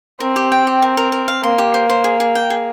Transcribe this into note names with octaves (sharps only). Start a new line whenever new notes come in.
C4 A#4
G4
G5
G4
A#4
A#4
A#4
F5
A#3 C6
G4
C5
C5
G#4
G#4
G5
G#4